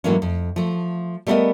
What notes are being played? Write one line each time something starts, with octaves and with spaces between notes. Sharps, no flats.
G#2 E3 F#3 A3 A#3 C#4
F2
F3 A3
G3 A3 B3 G#4 A#4 D#5